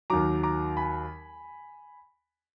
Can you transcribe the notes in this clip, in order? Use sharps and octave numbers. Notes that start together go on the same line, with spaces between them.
D#2 D#3 F#3 A#5 D6
A#5 D6
G#5 B5